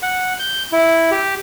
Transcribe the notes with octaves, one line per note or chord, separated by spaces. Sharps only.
F#5
G6
E4
G4